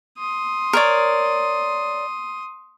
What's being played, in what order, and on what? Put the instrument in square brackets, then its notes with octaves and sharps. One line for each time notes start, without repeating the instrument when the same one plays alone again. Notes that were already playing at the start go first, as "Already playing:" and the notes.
[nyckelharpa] C6 D#6
[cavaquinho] A#4 C#5 D5